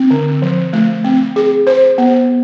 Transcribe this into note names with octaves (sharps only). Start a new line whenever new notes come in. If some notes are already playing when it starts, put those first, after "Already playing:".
Already playing: C4
D3
F3
A3
C4
G#4
C5
B3